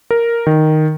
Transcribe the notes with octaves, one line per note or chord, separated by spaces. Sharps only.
A#4
D#3